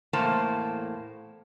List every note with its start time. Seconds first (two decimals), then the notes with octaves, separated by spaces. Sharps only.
0.13 E2 A2 A#3 C5 A5